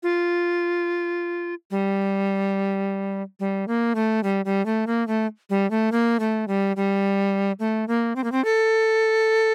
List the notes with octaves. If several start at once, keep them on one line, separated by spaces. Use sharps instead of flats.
F4
G3
G3
A#3
A3
G3
G3
A3
A#3
A3
G3
A3
A#3
A3
G3
G3
A3
A#3
C4
A#3
C4
A4